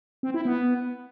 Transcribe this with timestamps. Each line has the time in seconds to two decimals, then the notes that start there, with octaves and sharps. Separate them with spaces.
0.23 C4
0.34 E4
0.45 B3